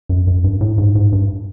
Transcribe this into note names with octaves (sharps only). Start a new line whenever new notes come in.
F#2
F#2
G2
A2
G#2
G#2
G2